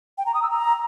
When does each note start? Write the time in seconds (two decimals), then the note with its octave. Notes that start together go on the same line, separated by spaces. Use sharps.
0.18 G5
0.26 A#5
0.34 D#6
0.43 E6
0.51 A#5